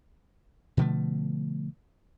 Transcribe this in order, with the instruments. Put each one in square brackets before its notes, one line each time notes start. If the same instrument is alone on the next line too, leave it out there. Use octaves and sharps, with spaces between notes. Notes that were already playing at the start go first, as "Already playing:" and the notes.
[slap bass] B2 D3 F3 A3